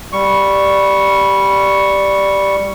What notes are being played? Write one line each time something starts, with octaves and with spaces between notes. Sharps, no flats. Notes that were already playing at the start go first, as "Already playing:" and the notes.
G3 C#6